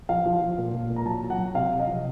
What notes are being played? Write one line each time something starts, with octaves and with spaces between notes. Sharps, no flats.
F3 F5
F3
F3
A#2
A#2
A#2
A#5
F#3 A5
F#3
F#5
F#3
C3 F5
C3
D#5
F3